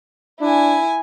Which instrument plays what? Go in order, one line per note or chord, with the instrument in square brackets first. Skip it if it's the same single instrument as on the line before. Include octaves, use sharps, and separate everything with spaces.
[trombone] D4 [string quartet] E4 G#5